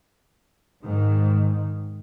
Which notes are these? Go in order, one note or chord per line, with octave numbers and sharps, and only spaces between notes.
G#2 D#3